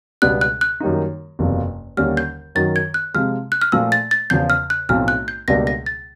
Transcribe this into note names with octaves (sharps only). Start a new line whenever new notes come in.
C#2 B2 G3 B3 D4 F#6
F#6
F#6
F#2 D#3 G3 A#3 D#4
F#1 E2 C3 F3
D#2 D3 G3 A#3 C#4 F6
G6
F#2 D#3 F#3 A6
G#6
F#6
C3 F3 G#3 F6
F#6
F6
A#2 F3 A3 E6
A6
A6
E2 C#3 F3 G6
F6
F#6
B1 A2 F3 A3 C4 F6
F#6
G6
C#2 B2 G3 A#3 D4 A#6
A#6
A6